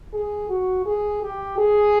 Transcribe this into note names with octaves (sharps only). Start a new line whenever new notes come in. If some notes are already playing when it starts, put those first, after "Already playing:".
G#4
F#4
G#4
G4
G#4